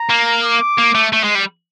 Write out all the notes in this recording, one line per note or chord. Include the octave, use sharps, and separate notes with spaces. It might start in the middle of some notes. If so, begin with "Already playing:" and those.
Already playing: A#5
A#3
D6
A#3
A3
A3
G#3
G3